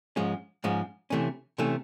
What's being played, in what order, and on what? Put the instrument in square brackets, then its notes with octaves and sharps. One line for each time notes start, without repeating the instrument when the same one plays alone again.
[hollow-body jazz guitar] G#2 F3 G#3 C#4
G#2 F3 G#3 C#4
C3 E3 A3 C#4
C3 E3 A3 C#4